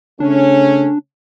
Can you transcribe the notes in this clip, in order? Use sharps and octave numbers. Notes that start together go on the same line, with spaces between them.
C#3 A3 C#4 D4